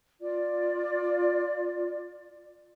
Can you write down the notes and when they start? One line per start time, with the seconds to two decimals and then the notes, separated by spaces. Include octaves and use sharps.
0.21 F4 D5